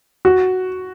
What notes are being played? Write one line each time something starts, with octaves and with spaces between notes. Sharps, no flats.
F#4